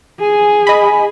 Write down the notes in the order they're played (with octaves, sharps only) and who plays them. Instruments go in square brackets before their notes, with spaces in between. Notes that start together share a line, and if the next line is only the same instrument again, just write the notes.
[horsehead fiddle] G#4 [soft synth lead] G#5
[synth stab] D#5 B5